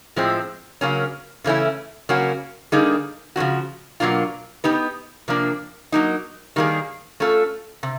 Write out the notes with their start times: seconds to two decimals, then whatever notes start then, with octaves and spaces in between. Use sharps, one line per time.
0.16 A2 F3 G#3 C4
0.81 C#3 F#3 A#3 C#4
1.44 C#3 E3 A3 C#4 E4
2.09 C#3 F#3 A#3 C#4 F#4
2.72 D3 G3 A#3 D#4 G#4
3.36 C#3 F3 G#3 C#4 F#4
4.00 B2 F#3 A#3 D4 F4
4.64 B3 D#4 G4 B4
5.28 C3 F3 A#3 D4
5.92 F#3 A#3 D#4
6.56 D#3 G3 A#3 D#4 G#4
7.20 A3 C#4 F4 A4
7.83 C3